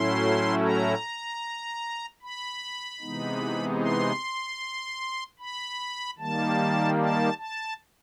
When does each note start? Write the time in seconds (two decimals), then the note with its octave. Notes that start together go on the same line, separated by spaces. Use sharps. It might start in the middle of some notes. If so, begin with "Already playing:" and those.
Already playing: A2 F#3 A3 C#4 E4 C6
0.63 A#5
2.22 B5
3.01 C3 E3 G#3 B3 D#4
3.81 C6
5.39 B5
6.18 D#3 G3 A#3 A5
6.99 A5
7.38 A5